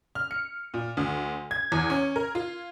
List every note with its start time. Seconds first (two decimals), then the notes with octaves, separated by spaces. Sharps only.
0.15 F6
0.31 C#7
0.74 A#2
0.97 D2
1.51 G#6
1.72 E2
1.90 C#4
2.16 A#4
2.35 F4